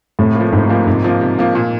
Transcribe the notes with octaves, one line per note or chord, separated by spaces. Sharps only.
A2 C3
F3 A#3
G#2 C3
F3 A#3
G#2 C3
F3 A#3
C3
F3 A#3
A#2